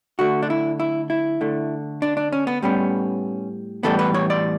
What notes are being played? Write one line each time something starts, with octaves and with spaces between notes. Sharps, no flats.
D3 A3 F#4
D4
E4
E4
E4
D3 A3
D4
D4
C#4
B3
A2 G3 B3 C#4
A2 E3 G3 B3 A4
B4
C#5
D5